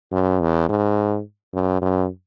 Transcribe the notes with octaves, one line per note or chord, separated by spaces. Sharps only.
F#2
E2
G#2
F#2
F#2